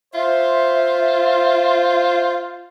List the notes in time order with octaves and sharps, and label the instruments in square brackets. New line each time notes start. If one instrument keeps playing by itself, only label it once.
[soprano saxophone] F4 [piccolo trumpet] C5 [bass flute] E5